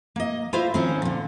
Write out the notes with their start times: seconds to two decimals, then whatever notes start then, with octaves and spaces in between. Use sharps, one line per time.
0.16 A#3 D#5
0.53 E4 F4 C5 E5 F5
0.74 D#3 F3 C4 C#4
1.02 A#2 D3